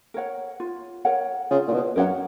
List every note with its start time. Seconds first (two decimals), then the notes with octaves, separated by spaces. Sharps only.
0.14 A#4 C#5 F#5
0.60 F4
1.05 A#4 C#5 F#5
1.51 C#3 F4
1.68 A#2
1.73 B2
1.96 F#2 A#4 C#5 F#5